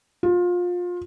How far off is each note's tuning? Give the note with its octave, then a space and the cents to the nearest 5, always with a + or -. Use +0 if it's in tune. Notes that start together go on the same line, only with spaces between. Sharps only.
F4 +25